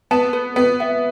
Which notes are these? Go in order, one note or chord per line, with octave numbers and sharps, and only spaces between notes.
B3 A5
B4
B3 B4
E5